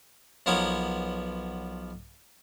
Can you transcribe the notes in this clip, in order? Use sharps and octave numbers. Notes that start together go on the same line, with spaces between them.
B1 F3 B3 A#4 C#5 D6